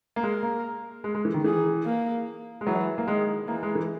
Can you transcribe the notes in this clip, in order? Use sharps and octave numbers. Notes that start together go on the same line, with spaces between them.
A#3
G#3 A#4
A#3
G#3
G#3
E3
D#3
E3 G#4
A#3
G#3
E3 F#3
A#3
D#3 G#3
E3 A#3
G#3
E3